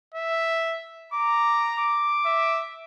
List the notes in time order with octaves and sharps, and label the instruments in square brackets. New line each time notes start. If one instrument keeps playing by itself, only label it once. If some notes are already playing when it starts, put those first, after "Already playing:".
[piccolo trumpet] E5
[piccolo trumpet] A#5 [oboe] D6
[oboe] D6
[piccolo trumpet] E5